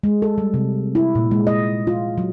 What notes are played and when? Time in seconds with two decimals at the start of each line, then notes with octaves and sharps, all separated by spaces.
0.04 G#3
0.22 A4
0.38 G3
0.54 C3
0.95 E4
1.15 A#2
1.31 G#3
1.47 D#5
1.87 F4
2.18 F#3